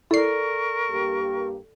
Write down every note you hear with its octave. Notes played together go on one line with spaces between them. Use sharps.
E4 A4 A#4 D5 C#6 C7
G2 A#3 G4